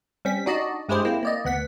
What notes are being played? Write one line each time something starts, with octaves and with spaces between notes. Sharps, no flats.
G3 C4 C#4 B6
D4 D#4 F#4 D5 D#5
G2 G#3 E4 G4 G#4 C5
A#3 C4 E4
A#3 D5 D#5
D2 B3 F#5 B6